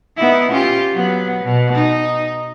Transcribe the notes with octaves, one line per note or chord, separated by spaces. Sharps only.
B3 D#4 E4
C#4 F4 G4
F#3 B3
B2
D#4